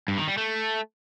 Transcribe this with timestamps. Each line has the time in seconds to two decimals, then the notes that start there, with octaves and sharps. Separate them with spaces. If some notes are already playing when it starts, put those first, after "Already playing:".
0.08 G2
0.18 D#3
0.28 G3
0.38 A3